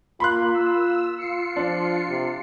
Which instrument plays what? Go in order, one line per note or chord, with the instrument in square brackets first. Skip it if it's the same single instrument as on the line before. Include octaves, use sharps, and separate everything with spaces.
[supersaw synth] A#3 [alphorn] F4 [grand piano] B5 C6 F#6
[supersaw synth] E6
F4 C7 C#7
[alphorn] F3 [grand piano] D4
[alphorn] C3